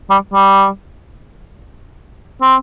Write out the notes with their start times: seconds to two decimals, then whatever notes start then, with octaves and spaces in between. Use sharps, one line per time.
0.10 G3
0.33 G3
2.42 C4